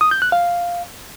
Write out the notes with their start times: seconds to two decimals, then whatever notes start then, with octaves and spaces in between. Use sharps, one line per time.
0.01 D#6
0.11 G6
0.22 F#6
0.32 F5